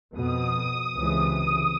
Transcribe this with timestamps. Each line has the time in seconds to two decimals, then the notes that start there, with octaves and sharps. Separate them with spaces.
0.14 F2 B2 D#6
0.97 C#2 C3 E3